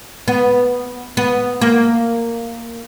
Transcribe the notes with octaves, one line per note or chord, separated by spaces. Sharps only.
B3
B3
A#3